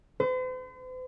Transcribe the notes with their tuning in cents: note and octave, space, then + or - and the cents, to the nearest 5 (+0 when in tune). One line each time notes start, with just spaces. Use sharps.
C5 -45